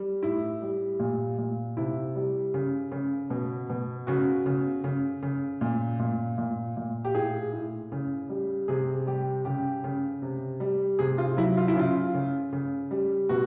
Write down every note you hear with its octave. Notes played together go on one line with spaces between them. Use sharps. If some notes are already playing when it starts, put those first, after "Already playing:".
Already playing: G3
A2 E4
G3
A#2
A#2
C3 E4
G3
C#3
C#3
B2
B2
C#3 F#4
C#3
C#3
C#3
A#2
A#2
A#2
A#2
G4
A2 G#4
A2
C#3
G3
C3 G#4
G3 G4
C#3 G4
C#3
C3
G3
C3 G#4
F4
F#3 E4
F4
E4
C#3 F4
C#3
C#3
G3
B2 F#4